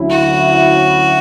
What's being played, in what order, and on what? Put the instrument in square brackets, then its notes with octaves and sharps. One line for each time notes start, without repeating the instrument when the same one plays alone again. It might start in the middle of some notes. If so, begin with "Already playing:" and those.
Already playing: [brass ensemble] D2 D3 F#3 C#4 E4
[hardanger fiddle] F#4